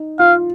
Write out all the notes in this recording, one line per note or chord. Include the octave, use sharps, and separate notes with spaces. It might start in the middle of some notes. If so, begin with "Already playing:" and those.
Already playing: D#4
F4 F5